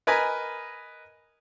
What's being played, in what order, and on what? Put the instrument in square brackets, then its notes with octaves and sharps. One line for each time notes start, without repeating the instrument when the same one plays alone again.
[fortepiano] A#4 B4 D#5 G#5 B5